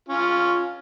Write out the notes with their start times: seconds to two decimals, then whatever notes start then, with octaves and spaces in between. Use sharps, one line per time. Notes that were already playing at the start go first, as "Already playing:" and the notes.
0.09 C#4 F4